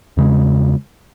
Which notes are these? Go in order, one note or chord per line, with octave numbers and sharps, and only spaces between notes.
E2 C#3 G#3